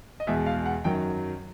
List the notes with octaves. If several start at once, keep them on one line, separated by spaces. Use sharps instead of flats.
D#5
E2 B2 G#3 E5
F5
F#5
F#2 D#3 F#3 G5